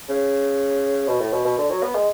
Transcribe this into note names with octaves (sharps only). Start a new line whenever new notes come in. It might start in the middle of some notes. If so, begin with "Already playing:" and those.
C#3
B2
A2
B2
B2
D3
F#3
B3
G#3